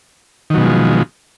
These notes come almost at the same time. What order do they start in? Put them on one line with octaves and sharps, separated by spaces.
D#3 F#3 B2 G#3 F3